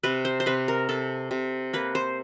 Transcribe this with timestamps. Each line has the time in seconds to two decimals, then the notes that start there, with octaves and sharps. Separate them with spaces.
0.03 C3 B4
0.25 C5
0.40 C5
0.46 C3 B4
0.68 A#4
0.89 C3 A4
1.31 C3
1.73 A#3 B4
1.95 C5